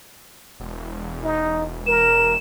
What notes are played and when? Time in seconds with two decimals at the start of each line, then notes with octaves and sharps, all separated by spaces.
0.60 E1
1.23 D#4
1.86 A#4 E7